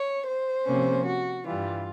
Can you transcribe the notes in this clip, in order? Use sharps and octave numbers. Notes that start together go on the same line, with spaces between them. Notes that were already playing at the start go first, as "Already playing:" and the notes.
Already playing: C#5
C5
C3 F3 A#3 C#4
F#4
G2 E3 G3 F4